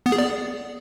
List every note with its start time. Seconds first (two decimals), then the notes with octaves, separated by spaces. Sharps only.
0.06 B3
0.12 G#4
0.18 D5